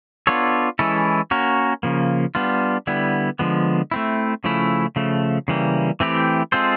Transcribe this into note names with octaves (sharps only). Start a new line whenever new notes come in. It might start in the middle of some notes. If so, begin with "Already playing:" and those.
B3 D4 F4 A4 C#5
E3 G#3 C#4 E4 A4
A#3 C#4 F#4 A#4
C#3 F3 A#3
G3 B3 D4 F4
D3 G3 B3 E4
D3 F3 G#3 B3
A3 C4 E4
C#3 F3 A3 C#4 E4
C#3 F3 A3
C#3 E3 G3 A#3
E3 A3 C4 E4 G4
G#3 C4 F4 A4 C5